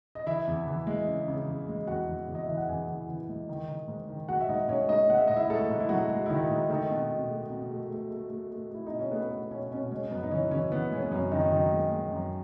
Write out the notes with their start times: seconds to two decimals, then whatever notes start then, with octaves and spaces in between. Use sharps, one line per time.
0.15 D#5
0.27 E3 E4 E5
0.47 E2
0.67 E3
0.87 G#3
1.08 C#3
1.28 C#3
1.47 E2
1.68 G#3
1.87 E2 F#4 F#5
2.08 E2
2.28 E2
2.35 D#5
2.45 E3 E5
2.57 F#5
2.68 E2 G#4 G#5
2.88 E3
3.08 E3
3.29 G#3
3.49 D#3
3.68 D#3
3.88 G#2
4.09 D#3
4.29 G#3 F#4 F#5
4.41 E5
4.48 G#2 D#4 D#5
4.68 G#2 C#4 C#5
4.89 G#3 D#4 D#5
5.09 G#3 F#5
5.18 E5
5.28 G#2 D#5
5.36 E4 E5
5.50 G#2 A3 A4
5.70 G#2
5.80 E4
5.89 F#3 G#3 F#4
6.09 G#3
6.26 E4
6.29 D#3 G#3 D#4
6.50 G#2
6.69 D#3 A3 D#4
6.91 B2
7.11 B2
7.30 A3
7.50 B2
7.70 A3
7.90 A3
8.11 A3
8.30 A3
8.51 A3
8.71 A3 E4
8.86 B2 D#4
8.99 C#4
9.11 A3 B3
9.31 A3 B3
9.51 B2 C#4
9.72 B2 C#4
9.91 G#3 C#4
10.11 F#2 B3
10.23 D#4
10.31 E3 C#4
10.51 E3 C#4
10.71 E3 B3
10.91 G#3 C#4
11.02 B3
11.11 F#2 C#4
11.31 F#2 D#3 D#4
11.52 F#2 D#3 D#4
11.72 G#3
11.92 G#3
12.12 F#2